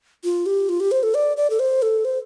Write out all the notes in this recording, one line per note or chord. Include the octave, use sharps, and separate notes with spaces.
F4
G4
F4
G4
C5
A4
D5
D5
A4
C5
A4
C5